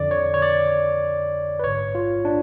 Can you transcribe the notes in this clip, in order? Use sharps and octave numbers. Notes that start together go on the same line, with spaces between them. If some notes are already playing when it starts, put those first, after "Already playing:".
Already playing: F2 D3 D5
C#5
C#5
D5
B4
A1 G#2 C#5
F4
D4